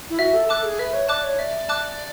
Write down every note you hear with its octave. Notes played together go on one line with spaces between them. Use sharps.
E4
F#4 E5
A4
A4 A5 D6 F#6
G#4
B4 E5
C#5
D5 A5 D6 F#6
C#5
D5 E5
A5 D6 F#6